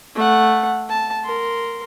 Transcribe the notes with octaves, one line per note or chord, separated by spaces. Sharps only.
A3 F#5
A5
A#4 C6